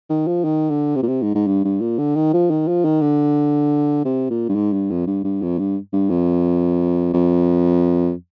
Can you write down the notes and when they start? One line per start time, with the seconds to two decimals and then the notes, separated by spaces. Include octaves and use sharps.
0.10 D#3
0.27 F3
0.44 D#3
0.70 D3
0.95 C3
1.03 A#2
1.08 C3
1.22 G#2
1.35 G#2
1.47 G2
1.65 G2
1.81 A#2
1.98 D3
2.15 D#3
2.33 F3
2.50 D#3
2.68 F3
2.84 D#3
3.01 D3
4.05 C3
4.30 A#2
4.49 G2
4.55 G#2
4.73 G2
4.91 F2
5.07 G2
5.24 G2
5.42 F2
5.59 G2
5.93 G2
6.10 F2
7.14 F2